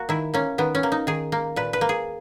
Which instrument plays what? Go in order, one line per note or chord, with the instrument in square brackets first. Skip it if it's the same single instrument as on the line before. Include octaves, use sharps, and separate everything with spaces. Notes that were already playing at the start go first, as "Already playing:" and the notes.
Already playing: [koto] A#3 F#4
D#3 E4
A#3 C#4
D#3 B3
C#4
A#3
D#4
D#3 G#4
A#3
A#2 B4
B4
A#3
G#4